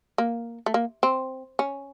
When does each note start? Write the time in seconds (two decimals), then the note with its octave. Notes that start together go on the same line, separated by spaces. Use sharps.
0.18 A#3
0.66 A3
0.74 A#3
1.03 C4
1.59 C#4